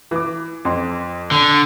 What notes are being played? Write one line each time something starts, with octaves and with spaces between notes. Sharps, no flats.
E3 D6
F2 C6
D3